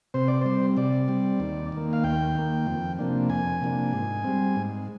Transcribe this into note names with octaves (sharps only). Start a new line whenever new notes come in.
C3 C5
D5
G3 C4 C5
C3 D5
G3 C4
D#2
D#3 A#3
F5
D#2 G5
D#3 A#3
F2
C3 F3 A#3 D4
F2 G#5
C3 F3 A#3 D4
G#2
G3 C4
G#2